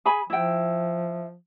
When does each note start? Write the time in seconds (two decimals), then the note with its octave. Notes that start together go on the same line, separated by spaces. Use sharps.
0.05 G#4 G#5 B5
0.30 F3 E4 G5